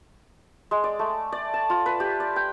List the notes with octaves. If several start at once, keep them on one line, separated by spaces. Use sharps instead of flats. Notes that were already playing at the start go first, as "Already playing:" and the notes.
G#3
D5
A3
D5
A5
F4
B4
G4
D5
G5